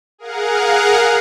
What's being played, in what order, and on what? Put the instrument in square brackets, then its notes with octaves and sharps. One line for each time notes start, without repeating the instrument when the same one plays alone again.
[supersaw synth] G#4 A#4 F5 F#5